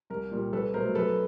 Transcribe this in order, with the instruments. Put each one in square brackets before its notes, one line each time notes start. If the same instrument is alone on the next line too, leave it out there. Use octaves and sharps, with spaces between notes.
[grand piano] C2 A#4
A#2 G3
C2 A4 B4
B2 F#3 A3 A#4 C5
F#2 A4 B4